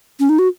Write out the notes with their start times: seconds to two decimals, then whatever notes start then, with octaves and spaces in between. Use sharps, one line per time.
0.20 C#4
0.29 D#4
0.39 F#4